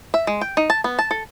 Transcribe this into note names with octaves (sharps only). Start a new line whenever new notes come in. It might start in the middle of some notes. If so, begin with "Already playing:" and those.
E5
G#3
G5
D#4
A5
B3
A5
A4